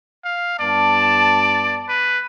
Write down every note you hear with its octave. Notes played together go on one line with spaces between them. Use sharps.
F5
G2 B3 D5 A5
B4